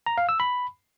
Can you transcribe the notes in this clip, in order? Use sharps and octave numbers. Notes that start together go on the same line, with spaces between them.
A#5
F5
E6
B5